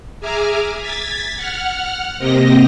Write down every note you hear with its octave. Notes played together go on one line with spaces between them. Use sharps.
G#4 E5 G#5 A#5 D6 F6
G#6 A6 B6
F#5 F6
C3 A#3 C4 G4 D#5 A#6